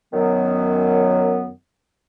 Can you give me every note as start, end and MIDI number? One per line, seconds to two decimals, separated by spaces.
0.13 1.50 42
0.13 1.50 51
0.13 1.50 54
0.13 1.50 59